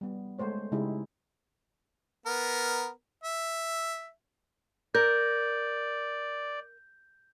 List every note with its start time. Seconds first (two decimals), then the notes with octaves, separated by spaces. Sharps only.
0.01 G3 B3
0.39 G#3 A3 C5 C#5
0.72 C#3 G#3 D#4 E4 G4 G#4
2.26 B3 A#4
3.24 E5
4.95 A#4 D5 G6